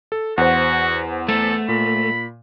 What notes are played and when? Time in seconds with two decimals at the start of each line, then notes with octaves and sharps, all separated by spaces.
0.12 A4
0.38 E2 F#4 C5 F#5
1.29 A3 A4
1.68 A#2 B5